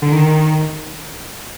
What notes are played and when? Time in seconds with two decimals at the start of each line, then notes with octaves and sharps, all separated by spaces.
0.02 D3
0.12 D#3